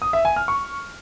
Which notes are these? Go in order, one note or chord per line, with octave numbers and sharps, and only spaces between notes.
D#6
E5
G#5
F6
C#6